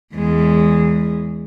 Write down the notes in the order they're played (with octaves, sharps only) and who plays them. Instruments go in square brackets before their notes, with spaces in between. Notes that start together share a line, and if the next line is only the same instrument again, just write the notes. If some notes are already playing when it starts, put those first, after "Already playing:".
[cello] E2 G#3